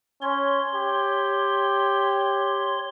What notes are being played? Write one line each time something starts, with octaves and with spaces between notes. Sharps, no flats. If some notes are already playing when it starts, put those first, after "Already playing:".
C#4 C#5 C6
G4